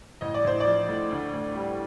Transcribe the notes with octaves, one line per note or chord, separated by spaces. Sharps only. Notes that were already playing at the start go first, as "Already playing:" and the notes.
A1 D#5
D5
A1 C5
D5
F3
A2
D2
D2
G3